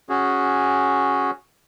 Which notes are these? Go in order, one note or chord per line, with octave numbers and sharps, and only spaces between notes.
C#4 F#4 G#4